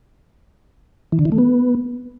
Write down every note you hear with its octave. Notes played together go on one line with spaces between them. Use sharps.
E3
D3
E3
A3
B3